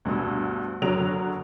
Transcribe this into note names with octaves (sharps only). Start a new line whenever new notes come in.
D2 G2 B2 E6
F#1 D3 F#3 F#4 D7 F7